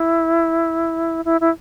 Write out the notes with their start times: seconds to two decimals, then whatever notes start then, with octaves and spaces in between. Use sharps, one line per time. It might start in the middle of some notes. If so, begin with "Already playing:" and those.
Already playing: E4
1.25 E4
1.41 E4